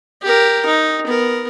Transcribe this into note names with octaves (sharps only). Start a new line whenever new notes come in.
G4 A#4
D#4
B3 A#4